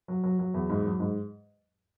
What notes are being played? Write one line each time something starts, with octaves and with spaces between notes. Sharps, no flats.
F#3
F#3
F#3
E2
G#2
F#3
G#2